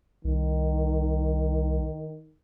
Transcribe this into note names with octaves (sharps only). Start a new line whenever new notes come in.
C2 D#3